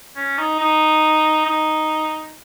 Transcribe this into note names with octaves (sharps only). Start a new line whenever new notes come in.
C#4
D#4
D#4
D#4